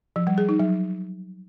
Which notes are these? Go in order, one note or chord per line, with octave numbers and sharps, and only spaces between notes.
F3
G3
G#4
D#4
F#3